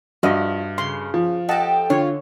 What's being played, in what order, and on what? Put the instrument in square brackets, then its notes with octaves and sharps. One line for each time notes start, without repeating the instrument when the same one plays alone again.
[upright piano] G2 [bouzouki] F3 [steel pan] F#4 D#5 E5
[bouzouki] C#3 [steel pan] C6
[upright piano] F3
[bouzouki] G4 A4 [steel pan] D#5 F#5 A5 [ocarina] G5
[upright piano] D3 [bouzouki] F4 [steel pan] C#5